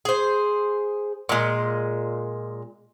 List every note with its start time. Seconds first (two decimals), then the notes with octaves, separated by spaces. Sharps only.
0.05 G#4 C5
1.29 A#2 G#3